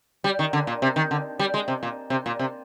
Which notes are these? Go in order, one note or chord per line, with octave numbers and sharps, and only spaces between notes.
G3
D#3
D3
A#2
C3
D#3
D3
G3
G#3
C3
A#2
C3
A#2
C3